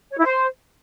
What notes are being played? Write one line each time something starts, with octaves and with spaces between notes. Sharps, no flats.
C#5
E4
C5